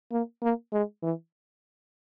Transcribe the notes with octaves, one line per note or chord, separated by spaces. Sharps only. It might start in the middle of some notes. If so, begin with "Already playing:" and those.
A#3
A#3
G#3
E3